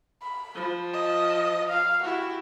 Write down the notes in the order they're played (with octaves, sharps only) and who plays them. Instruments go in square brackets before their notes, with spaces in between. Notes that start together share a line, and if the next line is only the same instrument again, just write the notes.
[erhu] B5
[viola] F3
[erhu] D#5
F5
[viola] E4 G4 [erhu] F#4